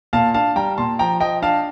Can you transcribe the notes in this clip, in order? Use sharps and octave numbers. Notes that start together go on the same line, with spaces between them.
A#2 F5 A5
D4 F5 A5
G3 G5 A#5
A#2 A5 C6
F3 G5 A#5
F3 D#5 G5
D4 F5 A5